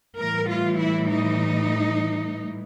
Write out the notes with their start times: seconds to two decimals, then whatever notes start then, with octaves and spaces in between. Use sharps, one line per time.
0.18 A2 E3 G3 A#4
0.47 F4
0.77 E4
1.08 D#4